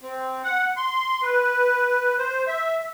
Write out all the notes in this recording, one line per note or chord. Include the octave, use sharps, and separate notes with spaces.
C4
F#5
C6
B4
C5
E5